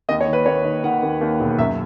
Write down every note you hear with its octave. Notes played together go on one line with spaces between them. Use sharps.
D#2 D#5
C#5
D#3
B4
D#2 C#5
D#3
D#3 F#5
D#2
D#2
E1
F#2 E5